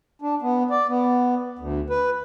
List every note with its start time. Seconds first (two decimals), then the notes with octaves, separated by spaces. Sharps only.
0.22 D4
0.42 B3
0.70 D5
0.88 B3
1.59 D2
1.90 B4